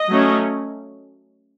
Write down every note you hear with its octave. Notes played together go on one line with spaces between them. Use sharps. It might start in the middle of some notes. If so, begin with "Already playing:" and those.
Already playing: D#5
F#3 A3 C#4